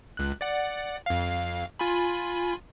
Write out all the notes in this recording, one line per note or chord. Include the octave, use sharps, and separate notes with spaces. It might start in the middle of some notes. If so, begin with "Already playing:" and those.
C#2 F#6
D5 F#5
F2 F5
F4 G#5 B5